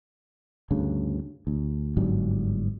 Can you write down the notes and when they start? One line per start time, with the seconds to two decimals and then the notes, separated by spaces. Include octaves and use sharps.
0.71 D2 G2 C#3
1.47 D2
1.97 G1 G#2 F#3 G3